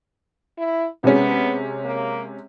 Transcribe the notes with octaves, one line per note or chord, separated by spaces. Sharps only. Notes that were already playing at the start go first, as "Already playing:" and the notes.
E4
C3 G#3 B3 C#4
A#3